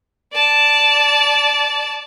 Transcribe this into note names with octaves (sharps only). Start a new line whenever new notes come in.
D5 A5